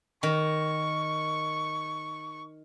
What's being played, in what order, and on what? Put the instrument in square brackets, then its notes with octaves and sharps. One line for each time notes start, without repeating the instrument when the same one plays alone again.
[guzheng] D#3 [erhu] C#6